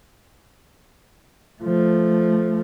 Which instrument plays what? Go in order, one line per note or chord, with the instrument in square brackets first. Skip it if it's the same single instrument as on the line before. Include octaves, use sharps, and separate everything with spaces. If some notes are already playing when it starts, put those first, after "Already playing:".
[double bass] F3 A3